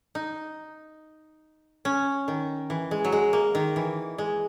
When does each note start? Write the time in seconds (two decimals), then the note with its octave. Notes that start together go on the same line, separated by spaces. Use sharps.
0.15 D#4
1.85 C#4
2.28 D#3
2.70 E3
2.91 G#3
3.04 F#3
3.12 G#3
3.33 A#3
3.55 D#3
3.76 E3
4.18 G#3